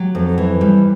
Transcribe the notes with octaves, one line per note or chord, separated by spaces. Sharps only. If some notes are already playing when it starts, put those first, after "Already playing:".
Already playing: F#3 G4
F2
E3
G3